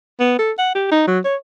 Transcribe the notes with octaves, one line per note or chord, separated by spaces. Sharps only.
B3
A4
F#5
G4
D#4
F#3
C#5